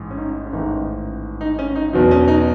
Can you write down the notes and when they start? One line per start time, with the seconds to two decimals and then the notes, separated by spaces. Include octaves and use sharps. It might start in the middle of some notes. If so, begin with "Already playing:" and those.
Already playing: A1 G#2
0.11 C#4
0.18 D#4
0.46 C#4
0.53 A1 G#2 D#3 D#4
1.41 D#4
1.59 C#4
1.76 D#4
1.93 E2 B2 F#3 D#4
2.11 C#4
2.28 D#4